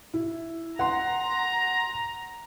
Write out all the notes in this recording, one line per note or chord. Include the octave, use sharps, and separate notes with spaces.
E4
F#5 A#5 C6